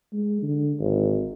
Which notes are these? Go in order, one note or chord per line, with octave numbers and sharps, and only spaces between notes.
G#3
D3
G#1